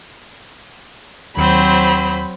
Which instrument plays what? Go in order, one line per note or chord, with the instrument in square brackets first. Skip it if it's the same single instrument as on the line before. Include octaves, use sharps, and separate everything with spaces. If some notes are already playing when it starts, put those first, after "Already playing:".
[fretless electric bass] D#2 [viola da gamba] F#3 [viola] C4 C5 [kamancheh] B5